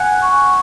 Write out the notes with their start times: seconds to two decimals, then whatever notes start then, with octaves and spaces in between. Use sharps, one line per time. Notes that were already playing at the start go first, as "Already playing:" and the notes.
Already playing: F#5 G#5
0.22 C#6